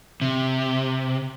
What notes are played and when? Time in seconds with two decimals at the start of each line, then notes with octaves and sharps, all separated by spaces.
0.22 C3